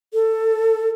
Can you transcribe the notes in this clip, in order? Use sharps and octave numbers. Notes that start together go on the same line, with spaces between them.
A4